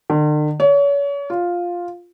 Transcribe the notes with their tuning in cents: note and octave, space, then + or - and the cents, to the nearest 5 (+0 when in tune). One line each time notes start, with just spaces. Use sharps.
D3 +45
C#5 +35
F4 +5